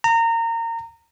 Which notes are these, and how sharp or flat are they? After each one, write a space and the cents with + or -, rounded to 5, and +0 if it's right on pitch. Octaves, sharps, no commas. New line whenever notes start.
A#5 -25